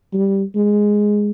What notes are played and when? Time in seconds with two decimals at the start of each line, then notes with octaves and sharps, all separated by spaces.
0.13 G3
0.55 G#3